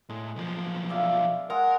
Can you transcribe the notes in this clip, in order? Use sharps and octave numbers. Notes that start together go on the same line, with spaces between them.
A2 G#3
B1 F3
D5 E5 F5
G#3 A#4 F#5